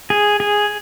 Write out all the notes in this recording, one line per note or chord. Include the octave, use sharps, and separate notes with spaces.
G#4
G#4